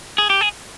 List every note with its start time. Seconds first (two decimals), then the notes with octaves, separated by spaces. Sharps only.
0.18 G#4
0.30 G4
0.41 G#4